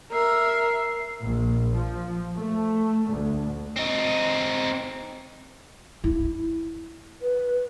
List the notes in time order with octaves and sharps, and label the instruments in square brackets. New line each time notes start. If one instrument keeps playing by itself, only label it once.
[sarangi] A#4 [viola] E5 [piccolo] C7
[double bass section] A#1
F3
A3
D2
[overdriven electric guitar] C4 D#4
[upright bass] E4
[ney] B4